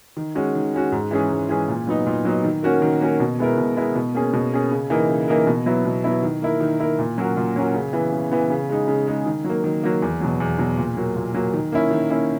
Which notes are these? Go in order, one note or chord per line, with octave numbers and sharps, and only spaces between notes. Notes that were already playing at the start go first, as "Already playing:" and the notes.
D#3
G#3 C#4 F#4
D#3
G#3 C#4 F#4
G#2
E3 G#3 C#4 G#4
G#2
E3 G#3 C#4 G#4
A#2
F#3 B3 D#4
A#2
F#3 B3 D#4
D#3
A#3 C#4 F#4 A#4
D#3
A#3 C#4 F#4 A#4
B2
G#3 B3 E4 A#4
B2
G#3 B3 E4 A#4
B2
A#3 C#4 G#4
B2
A#3 C#4 G#4
C#3
E3 A#3 D#4 A#4
C#3
E3 A#3 D#4 A#4
B2
F#3 B3 E4
B2
F#3 B3 E4
D#3
A#3 E4 A#4
D#3
A#3 E4 A#4
A#2
F#3 C#4 F#4 A#4
A#2
F#3 C#4 F#4 A#4
C#3
E3 B3
C#3
E3 B3
C#3
G#3 D#4
C#3
G#3 D#4
D#3
F#3 A#3
D#3
F#3 A#3
E2
B2 F#3
E2
B2 F#3
A#2
F#3 A#3
A#2
F#3 A#3
D#3
A#3 C#4 E4
D#3
A#3 C#4 E4